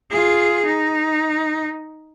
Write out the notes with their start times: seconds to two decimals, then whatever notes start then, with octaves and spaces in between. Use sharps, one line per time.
0.10 F4 G#4
0.66 D#4